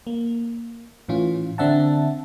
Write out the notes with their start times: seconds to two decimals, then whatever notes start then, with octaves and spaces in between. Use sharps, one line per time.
0.07 A#3
1.09 A2 E3 C#4 F4
1.58 D3 C4 D4 E5 F#5 A5